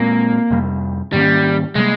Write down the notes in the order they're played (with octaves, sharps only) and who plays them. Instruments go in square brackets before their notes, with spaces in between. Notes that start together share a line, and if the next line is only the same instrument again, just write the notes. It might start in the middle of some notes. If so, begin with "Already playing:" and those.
Already playing: [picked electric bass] A#2 G#3 C4 [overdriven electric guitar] A#3
[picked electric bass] F2 C3 G3
[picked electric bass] G#2 D#3 A#3 C#4 [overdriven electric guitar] G3
[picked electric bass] C3 G3 A#3 [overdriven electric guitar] G#3